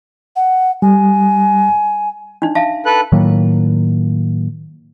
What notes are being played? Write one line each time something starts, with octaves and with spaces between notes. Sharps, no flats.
F#5
G3 G#5
D4 D#4
E5 F5 A5
A4 B4 F#6
A2 D#3 F#3 A#3